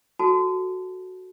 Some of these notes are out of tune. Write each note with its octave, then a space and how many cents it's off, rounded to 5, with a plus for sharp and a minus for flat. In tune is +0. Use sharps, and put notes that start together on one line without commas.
F#4 +0 A4 +0 A5 -15